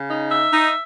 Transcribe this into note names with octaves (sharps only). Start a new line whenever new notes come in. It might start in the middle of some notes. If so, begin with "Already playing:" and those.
Already playing: C#3
D#4
E5
D#4